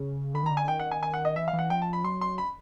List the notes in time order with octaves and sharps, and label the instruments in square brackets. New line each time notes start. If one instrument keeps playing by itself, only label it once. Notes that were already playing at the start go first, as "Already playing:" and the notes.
Already playing: [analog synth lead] C#3
[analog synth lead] D3 [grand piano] B5
[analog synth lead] D#3 [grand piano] A#5
[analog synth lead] D3
[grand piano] G#5
[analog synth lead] D#3 [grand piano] G5
[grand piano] F#5
G#5
G#5
F#5
D#5
[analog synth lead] E3 [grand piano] E5
[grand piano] F5
[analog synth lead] E3
[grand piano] F#5
[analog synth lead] F3 [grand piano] G5
[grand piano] A5
B5
[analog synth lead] F#3 [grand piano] C6
[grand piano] C6
B5